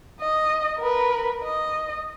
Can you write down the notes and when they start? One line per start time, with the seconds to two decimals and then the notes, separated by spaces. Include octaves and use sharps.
0.20 D#5
0.79 A#4 B4
1.43 D#5